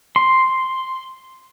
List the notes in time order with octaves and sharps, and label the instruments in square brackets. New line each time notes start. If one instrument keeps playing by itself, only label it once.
[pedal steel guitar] C6